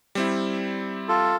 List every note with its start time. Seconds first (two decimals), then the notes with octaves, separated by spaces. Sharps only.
0.15 G3 C4 E4
1.09 F4 A4